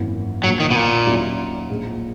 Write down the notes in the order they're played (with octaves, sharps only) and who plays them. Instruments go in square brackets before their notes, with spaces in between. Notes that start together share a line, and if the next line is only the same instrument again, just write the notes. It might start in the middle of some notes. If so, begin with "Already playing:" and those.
Already playing: [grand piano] G#1 F#2 E3 A#3
[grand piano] A#1 A#2 A#3 [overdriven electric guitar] F#3
[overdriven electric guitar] D#3
B2
A#2
[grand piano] D#2 D#3 F#3 C#4 E4
A#1 A#2 G#3